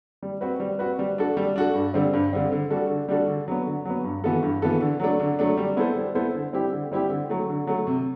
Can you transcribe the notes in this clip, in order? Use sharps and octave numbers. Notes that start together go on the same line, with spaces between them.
G3
C4 F#4 B4
G3
C4 F#4 B4
G3
D4 F#4 A4
G3
D4 F#4 A4
G2
D3 G3 C4
G2
D3 G3 C4
D3
G3 D4 F#4 A4
D3
G3 D4 F#4 A4
D3
F#3 B3
D3
F#3 B3
G2
E3 B3 F#4 A4
G2
E3 B3 F#4 A4
D3
F#3 A3 D4
D3
F#3 A3 D4
G3
B3 E4 A4 C5
G3
B3 E4 A4 C5
D3
G3 C4 E4 G4
D3
G3 C4 E4 G4
D3
F#3 A3
D3
F#3 A3
C3